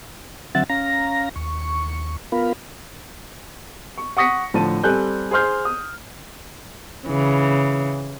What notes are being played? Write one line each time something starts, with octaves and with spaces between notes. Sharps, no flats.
D3 F#3 C4 E5 F#5 A6
C#4 F5 A#5 A#6
D#2 C#6
B3 F4 A#4 F5 B5
C#6
F#5 C#6 D#6 A#6 B6 C#7
A2 D3 F3 A5 D#7
G3 C4 A4 G#5 F#6 G6
G#4 C5 C6 F6 G6
D#6
C#3 E3